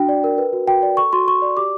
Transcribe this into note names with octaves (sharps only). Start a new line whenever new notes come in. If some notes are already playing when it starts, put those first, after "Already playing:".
Already playing: D4 F#4 G5
D5
A#4
B4
F#4
F#4 G5
D5
A4 C#6
F#4 C6
F#4 C#6
D5
G4 D6